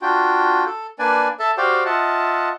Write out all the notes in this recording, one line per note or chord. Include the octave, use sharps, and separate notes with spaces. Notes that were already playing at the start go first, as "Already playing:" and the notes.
D4 F4 F#4 G5
A4
A#3 D4 B4 D5 G#5
A4 E5 A5
F#4 G4 C5 D5 F5 G5
F4 D#5 E5 F#5 A5